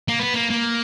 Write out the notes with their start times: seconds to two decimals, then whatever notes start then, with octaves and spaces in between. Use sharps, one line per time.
0.08 A#3
0.19 B3
0.34 A#3
0.50 A#3